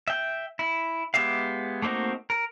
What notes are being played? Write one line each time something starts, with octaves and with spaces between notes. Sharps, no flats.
E5 G5
E4
G#3 B3 G4 E5 F5
A3 A#3 C4 D#4 F#4
A#4